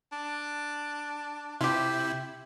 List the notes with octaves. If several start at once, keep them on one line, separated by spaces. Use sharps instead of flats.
D4
C3 E4 F4 G4